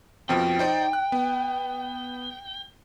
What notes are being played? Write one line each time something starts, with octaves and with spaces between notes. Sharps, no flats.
F2 B2 F3 G5
D#4 C5 D5
F#6
B3